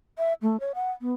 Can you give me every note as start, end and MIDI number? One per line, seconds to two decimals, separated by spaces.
0.18 0.33 76
0.42 0.59 57
0.60 0.72 73
0.75 0.91 78
1.01 1.13 59